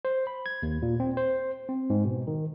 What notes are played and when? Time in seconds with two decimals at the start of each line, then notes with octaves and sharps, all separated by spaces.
0.05 C5
0.27 B5
0.46 G#6
0.63 D#2
0.82 A#2
1.00 C4
1.17 C5
1.69 C4
1.90 G#2
2.05 B2
2.27 D#3